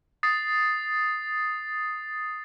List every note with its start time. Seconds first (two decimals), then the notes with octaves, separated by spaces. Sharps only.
0.23 D#6 A6 C7